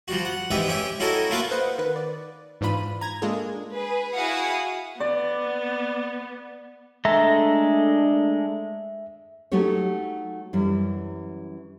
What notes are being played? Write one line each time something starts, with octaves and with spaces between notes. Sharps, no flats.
F3 G3 F#4
F#5
F2 G#2 E3 G4 E5 D#6
C#4 G4 E5
C#4 E4 F#4 A4 A#4 D#5
A3 A#3 F4 A#4 B4 F5
B4 C5 D#5 F5 F#5
D#3 B4
D5
G#2 E3 D4 F4 B5 D#7
A#5 G#6 A#6
G#3 A#3 D4 F4 G#4 A4
G#4 B4
E4 F#4 G#4 F5 F#5 D#6
B3 D5
G#3 A3 D4 A4 E5 A#5
F#3 A3 D#4 F#4 G4 C#5
F#2 E3 G3